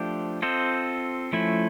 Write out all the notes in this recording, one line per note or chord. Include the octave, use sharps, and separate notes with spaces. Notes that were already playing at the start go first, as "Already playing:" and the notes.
Already playing: F3 A3 D4 G4 C5
C4 F4 A4 C5 D#5
F3 A3 C#4 E4